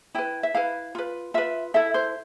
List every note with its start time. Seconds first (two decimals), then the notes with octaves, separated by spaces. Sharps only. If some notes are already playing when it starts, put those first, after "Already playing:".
0.15 E4 B4 G5
0.43 E5
0.54 E4 B4 F5
0.95 F4 B4
1.34 F4 B4 E5
1.74 E4 A4 E5
1.94 C5